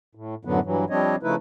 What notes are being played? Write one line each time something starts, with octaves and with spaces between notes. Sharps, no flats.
A2
F#2 A2 D3 F#3 B3
G2 E3 F#3
F3 G3 C4 D4 C#5 D#5
C#3 F3 A3 D#4 E4 B4